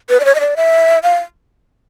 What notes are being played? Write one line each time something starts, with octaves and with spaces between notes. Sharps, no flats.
B4
D5
C#5
D#5
D5
E5
F5